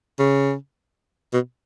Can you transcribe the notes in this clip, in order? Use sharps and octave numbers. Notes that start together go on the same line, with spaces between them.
C#3
B2